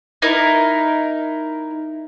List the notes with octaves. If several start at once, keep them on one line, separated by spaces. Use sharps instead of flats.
D#4 E4 A#4